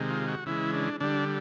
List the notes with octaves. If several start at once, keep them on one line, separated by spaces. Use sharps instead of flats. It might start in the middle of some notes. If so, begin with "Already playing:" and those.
Already playing: C3 D#3 G#3
F4
F#4
C#3 E3 G#3 E4
D4
D3 G3 D4